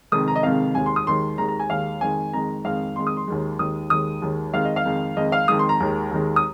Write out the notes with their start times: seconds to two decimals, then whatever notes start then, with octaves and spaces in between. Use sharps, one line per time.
0.12 F1 F2 D#3 G#3 D#6
0.28 A#5
0.36 D#5
0.43 F1 F2 D#3 G#3 F5
0.75 D#2 D#3 G#3 G#5
0.86 C6
0.96 D#6
1.06 D#2 D#3 G#3 C6
1.38 D#2 D#3 G#3 A#5
1.48 A#5
1.60 G#5
1.70 D#2 D#3 G#3 F5
2.01 F2 D#3 G#3 G#5
2.32 F2 D#3 G#3 A#5
2.64 F2 D#3 G#3 F5
2.96 F2 D#3 G#3 C6
3.07 D#6
3.17 C6
3.27 D#2 D#3 G#3
3.59 D#2 D#3 G#3 D#6
3.90 D#2 D#3 G#3 D#6
4.22 D#2 D#3 G#3
4.53 F2 D#3 G#3 F5
4.65 D#5
4.76 F5
4.85 F2 D#3 G#3
5.17 F2 D#3 G#3 D#5
5.32 F5
5.48 F2 D#3 G#3 D#6
5.59 C6
5.69 A#5
5.80 D#2 D#3 G#3
6.11 D#2 D#3 G#3
6.36 D#6